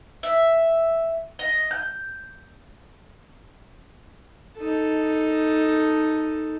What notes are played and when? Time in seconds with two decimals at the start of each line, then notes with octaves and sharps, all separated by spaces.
0.23 E5
1.39 D#5
1.71 G6
4.57 D#4 A4